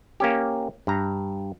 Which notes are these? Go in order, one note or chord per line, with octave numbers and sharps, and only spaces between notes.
A#3 C#4 G4
G2 A#5